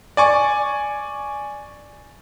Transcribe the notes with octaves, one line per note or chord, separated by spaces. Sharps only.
D5 G#5 C#6